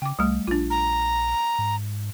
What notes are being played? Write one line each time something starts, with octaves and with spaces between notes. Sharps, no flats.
C#3 G5 D6
C2 G3 A3
A#1 D4 F4
A#5
G#2